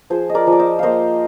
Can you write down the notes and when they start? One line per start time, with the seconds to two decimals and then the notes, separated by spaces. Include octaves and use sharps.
0.10 F3 G#4 C5
0.29 D#5
0.35 A#4 D5
0.47 F3
0.52 D5
0.59 C5 D#5
0.79 A#3 C5 D#5 F5